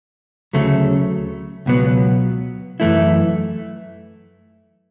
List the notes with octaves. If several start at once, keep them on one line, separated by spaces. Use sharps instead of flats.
D2 C#3 F#3 A3
C#2 B2 F#3 B3
F#2 E3 A3 E4